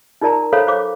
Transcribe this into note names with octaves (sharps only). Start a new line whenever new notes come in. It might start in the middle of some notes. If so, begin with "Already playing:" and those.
D#4 F4 A#4 D5 A5 A#5
A4 C5 C#5 F5 B5
C5 C#5 F5 D6